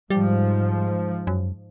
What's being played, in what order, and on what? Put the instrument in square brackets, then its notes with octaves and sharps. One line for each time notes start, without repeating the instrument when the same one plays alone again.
[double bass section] G#2 F3 [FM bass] G3
[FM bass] F#2